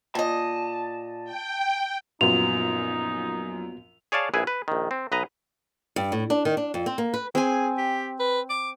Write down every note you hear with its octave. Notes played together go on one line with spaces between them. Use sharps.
A#2 D#5 A5
G5
A#1 F#2 F3 B3 D#4 F4 F#4 F7
G#4 C#5 D5 F5 A5
A#1 E4 G#4 B4 G#5
B4
A#1 D#3
C4
B1 B4 D#5 A#5
G2
A2
D4
D#3
D4
F2
C4
A#3
B4
C4 G#4 G#5
G4
B4
D6